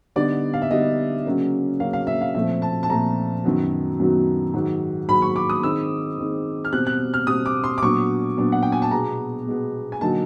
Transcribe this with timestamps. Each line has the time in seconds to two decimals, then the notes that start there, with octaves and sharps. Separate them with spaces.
0.16 D3 G3 B3 D#4 D5
0.54 F5
0.62 E5
0.71 D3 G3 B3 D#4 D#5
1.25 C#3 F#3 A#3 C#4
1.80 C#3 F#3 A#3 C#4 F5
1.93 F5
2.07 E5
2.21 F5
2.35 A#2 F3 A3 C4 E5
2.62 A5
2.83 A5
2.90 A#2 F3 A3 C4 A#5
3.44 F#2 D#3 F#3 B3
4.00 F#2 D#3 F#3 B3
4.54 G#2 D#3 F#3
5.08 G#2 D#3 F#3 B5
5.22 C#6
5.36 D6
5.50 D#6
5.63 D#3 G#3 C4 D#4 E6
6.18 D#3 G#3 C4 D#4
6.65 F6
6.72 B2 G3 C4 F#6
6.87 F#6
7.14 F6
7.27 B2 G3 C4 D#6
7.46 D6
7.64 C6
7.78 D6
7.82 A#2 F#3 B3 D4 C#6
8.37 A#2 F#3 B3 D4
8.52 F#5
8.63 G5
8.72 G#5
8.82 A5
8.91 B2 G#3 B3 A#5
9.46 B2 G#3 B3
9.92 G#5
10.01 D3 F#3 A#3 D#4 A5